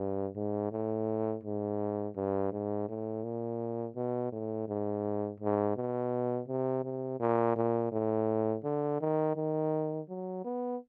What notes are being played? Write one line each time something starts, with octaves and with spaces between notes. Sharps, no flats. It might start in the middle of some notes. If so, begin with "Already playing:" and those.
Already playing: G2
G#2
A2
G#2
G2
G#2
A2
A#2
B2
A2
G#2
G#2
B2
C3
C3
A#2
A#2
A2
D3
D#3
D#3
F#3
B3